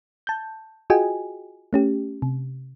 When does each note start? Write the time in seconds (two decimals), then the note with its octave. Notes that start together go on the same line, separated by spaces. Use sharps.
0.27 A5 G6
0.90 F4 F#4 G#4 D#5 G5 G#5
1.73 A3 C#4 G4
2.22 C3